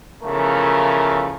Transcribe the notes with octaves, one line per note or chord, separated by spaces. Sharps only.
E2 C#3 F3 A3 A#4